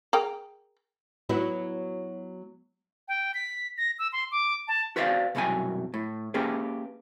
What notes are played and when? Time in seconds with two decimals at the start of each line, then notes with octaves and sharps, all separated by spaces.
0.13 G#4 A#4 G5
1.29 F#3 B3 E4
3.08 G5
3.34 B6
3.78 A#6
3.99 E6
4.12 C6
4.32 D6
4.68 A5
4.96 F#4 B4 C5 D5 E5 F5
5.35 C2 F#2 B2 F#3 G5 G#5
5.94 A2
6.34 A#3 C#4 G4 G#4 B4